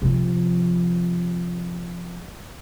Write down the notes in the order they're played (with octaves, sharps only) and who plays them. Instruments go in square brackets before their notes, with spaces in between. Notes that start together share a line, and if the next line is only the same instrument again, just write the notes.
[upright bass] C3 F3